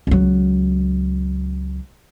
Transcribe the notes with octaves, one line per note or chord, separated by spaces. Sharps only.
C#2 F#3